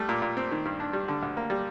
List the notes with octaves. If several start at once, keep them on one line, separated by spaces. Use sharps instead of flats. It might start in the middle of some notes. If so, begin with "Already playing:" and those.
Already playing: G3 A3
A#2
A#2
C4
D#3
G2
D4
G3
D3
D2
A#3
G3